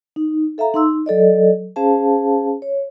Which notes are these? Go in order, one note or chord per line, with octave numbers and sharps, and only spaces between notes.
D#4
A4 E5 F5 A#5
D#4 C6 E6
F#3 A4 D5 D#5
C#4 G#4 C5 F5 A5
C#5